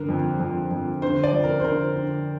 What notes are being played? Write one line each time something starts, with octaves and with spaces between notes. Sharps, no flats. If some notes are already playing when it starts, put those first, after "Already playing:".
Already playing: G2 D3 A#4
F2
F2
F2
D3 C5
D5
F2
A#4
C5
D3 A#4
D3